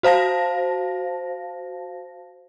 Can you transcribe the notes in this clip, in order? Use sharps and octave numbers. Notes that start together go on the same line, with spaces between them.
F#4 C5 F5 A5 A#6